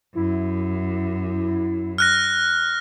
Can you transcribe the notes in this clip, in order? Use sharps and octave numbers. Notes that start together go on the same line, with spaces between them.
F#2 E4
F6 F#6 A#6